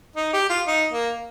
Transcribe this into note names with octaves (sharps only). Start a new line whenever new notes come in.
D#4
G4
F4
D#4
A#3